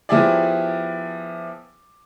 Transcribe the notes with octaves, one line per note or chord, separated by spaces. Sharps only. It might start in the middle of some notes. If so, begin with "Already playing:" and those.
F3 B3 E4 G4 G#4 D5